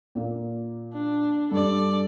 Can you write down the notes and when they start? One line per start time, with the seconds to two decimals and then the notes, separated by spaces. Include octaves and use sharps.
0.15 A#2 A#3
0.93 D4
1.52 G2 A4 D5